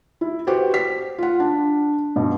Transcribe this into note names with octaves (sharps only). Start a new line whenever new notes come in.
E4
F#4 G4 B4 C5
B6
F4 F#5
D4
G2 B2